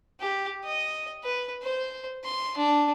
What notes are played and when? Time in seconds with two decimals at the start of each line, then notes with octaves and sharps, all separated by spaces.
0.20 G4
0.64 D#5
1.23 B4
1.62 C5
2.24 C6
2.57 D4